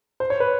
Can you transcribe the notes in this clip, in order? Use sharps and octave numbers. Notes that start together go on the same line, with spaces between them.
C5
C#5
B4